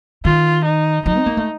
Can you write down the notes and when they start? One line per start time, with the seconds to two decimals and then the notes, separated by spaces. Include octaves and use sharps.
0.24 D#3 F4
0.65 D#4
1.06 F3 D#4
1.16 C4
1.26 A#3
1.37 A3